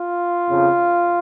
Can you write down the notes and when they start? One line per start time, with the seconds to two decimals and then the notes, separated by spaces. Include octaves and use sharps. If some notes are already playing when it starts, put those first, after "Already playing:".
Already playing: F4
0.47 F2 C#3 F3